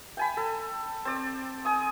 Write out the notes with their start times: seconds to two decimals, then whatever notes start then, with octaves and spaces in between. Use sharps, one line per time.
0.17 G5 G#5 B5
0.37 A4
1.05 C4 D5
1.65 G#5 D#6